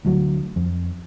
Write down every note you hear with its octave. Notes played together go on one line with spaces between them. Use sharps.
D2 F#3
F2